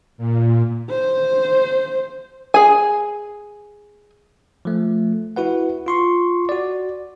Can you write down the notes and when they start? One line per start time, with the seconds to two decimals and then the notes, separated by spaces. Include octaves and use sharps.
0.18 A#2
0.90 C5
2.54 G#4 G#5
4.65 F3 A3
5.36 E4 F#4 B4 F#5
5.86 F4 C6 C#6
6.49 F#4 D5